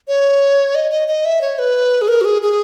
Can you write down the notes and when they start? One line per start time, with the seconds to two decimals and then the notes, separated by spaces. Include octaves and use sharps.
0.08 C#5
0.75 D#5
0.91 D#5
1.08 D#5
1.25 E5
1.41 C#5
1.59 B4
2.02 G#4
2.08 A#4
2.21 F#4
2.25 G#4
2.42 G#4